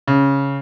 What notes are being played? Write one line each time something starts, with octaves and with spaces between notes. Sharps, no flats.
C#3